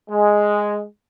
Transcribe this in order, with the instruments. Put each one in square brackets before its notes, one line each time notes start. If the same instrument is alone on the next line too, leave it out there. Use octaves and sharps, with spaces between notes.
[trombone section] G#3